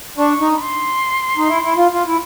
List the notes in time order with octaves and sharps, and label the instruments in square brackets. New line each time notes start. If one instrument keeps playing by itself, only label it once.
[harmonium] D4 [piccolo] C#6
[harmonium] D#4
[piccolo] B5
C6
[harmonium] D#4
E4
E4
F4
F4
E4